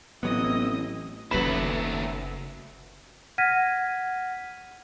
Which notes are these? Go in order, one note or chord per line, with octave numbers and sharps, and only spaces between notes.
A1 F#3 B3 C4 E4 D#5 D#6
F#1 D#2 C#3 F#3 A3 B4 B5 E7
F#5 F6 G#6 A#6 B6 D#7